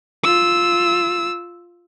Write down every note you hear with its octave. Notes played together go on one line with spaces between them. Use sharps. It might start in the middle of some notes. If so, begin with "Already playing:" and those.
F4 E6